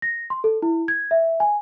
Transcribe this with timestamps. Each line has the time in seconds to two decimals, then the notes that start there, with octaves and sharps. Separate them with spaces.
0.02 A#6
0.30 C6
0.44 A4
0.62 E4
0.88 G#6
1.11 E5
1.40 G#5